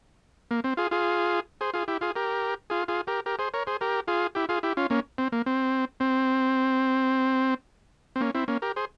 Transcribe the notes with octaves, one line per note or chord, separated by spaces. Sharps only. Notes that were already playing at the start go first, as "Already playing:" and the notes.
A#3
C4
F4 G#4
F4 G#4
G#4 C5
F4 G#4
E4 G4
F4 G#4
G4 A#4
F4 G#4
F4 G#4
G4 A#4
G4 A#4
G#4 C5
A#4 C#5
G#4 C5
G4 A#4
F4 G#4
E4 G4
F4 G#4
E4 G4
C#4 F4
A#3 C#4
C4
A#3
C4
C4
C4
A#3 C#4
C4 E4
A#3 C#4
G4 A#4
G#4 C5